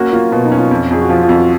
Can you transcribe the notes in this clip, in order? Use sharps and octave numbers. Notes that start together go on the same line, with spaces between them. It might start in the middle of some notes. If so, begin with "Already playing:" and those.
Already playing: A#3 C#4 F#4
A#3 F4
B2 F4
D#4
C#4
F4
F2
F2 G#4
F#4
F3 F4
F4
F2
F#4